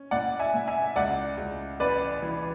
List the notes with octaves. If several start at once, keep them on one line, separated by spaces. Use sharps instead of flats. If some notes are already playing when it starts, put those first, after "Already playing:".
Already playing: C#4
A2 D5 F#5
E5 G#5
A2
E5 G#5
C#2 D5 F#5
C#2
A1 B4 D5
E3